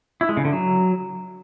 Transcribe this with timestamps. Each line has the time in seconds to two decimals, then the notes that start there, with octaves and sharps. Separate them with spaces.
0.21 E4
0.29 G#3
0.37 C#3
0.45 D3
0.53 F#3